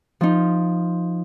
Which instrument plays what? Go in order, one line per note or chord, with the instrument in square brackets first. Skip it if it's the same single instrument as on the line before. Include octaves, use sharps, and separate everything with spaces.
[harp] F3 D#4